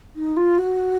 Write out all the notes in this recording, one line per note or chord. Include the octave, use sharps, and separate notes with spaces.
D#4
F4
F#4